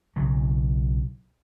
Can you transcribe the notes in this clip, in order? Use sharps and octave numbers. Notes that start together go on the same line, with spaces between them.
B1 C#3 F#3